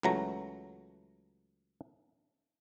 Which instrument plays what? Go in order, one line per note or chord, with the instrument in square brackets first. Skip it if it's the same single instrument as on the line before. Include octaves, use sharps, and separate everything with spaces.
[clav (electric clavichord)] C#2 E3 F#3 A3 A#5